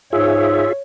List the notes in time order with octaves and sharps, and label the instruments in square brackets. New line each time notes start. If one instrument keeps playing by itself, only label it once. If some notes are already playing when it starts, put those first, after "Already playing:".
[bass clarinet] G#2 [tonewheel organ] F4 G#4 E5 [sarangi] C#5